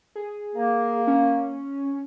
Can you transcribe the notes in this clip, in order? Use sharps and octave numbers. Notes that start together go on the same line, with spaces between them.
G#4
A#3
C#4